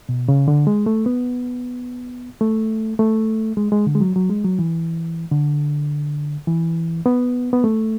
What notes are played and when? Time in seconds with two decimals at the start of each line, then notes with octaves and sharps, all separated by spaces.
0.09 B2
0.28 C#3
0.48 D3
0.67 G#3
0.86 A3
1.06 B3
2.41 A3
2.99 A3
3.57 G#3
3.72 G#3
3.87 D3
3.95 G#3
4.01 F#3
4.16 F#3
4.30 G#3
4.45 F#3
4.59 E3
5.31 D3
6.48 E3
7.06 B3
7.53 B3
7.64 A3